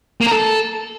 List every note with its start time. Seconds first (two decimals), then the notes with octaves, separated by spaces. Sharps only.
0.21 A#3
0.26 A#4
0.32 A4